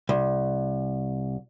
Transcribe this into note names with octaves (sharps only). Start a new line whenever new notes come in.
C2